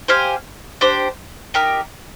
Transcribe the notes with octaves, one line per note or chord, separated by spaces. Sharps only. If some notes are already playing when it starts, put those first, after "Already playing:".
G4 C5 F5 G#5
D4 G4 C5
D#4 G4 A#4